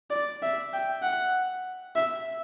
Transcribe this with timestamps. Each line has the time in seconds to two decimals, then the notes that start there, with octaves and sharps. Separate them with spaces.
0.10 D5
0.42 E5
0.73 G5
1.02 F#5
1.96 E5